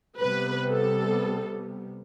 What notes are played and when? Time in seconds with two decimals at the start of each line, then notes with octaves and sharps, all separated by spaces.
0.19 C3 G3 B3 B4
0.71 A4